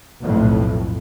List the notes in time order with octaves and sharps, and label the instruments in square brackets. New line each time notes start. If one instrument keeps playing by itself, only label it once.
[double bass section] B1 F2 A2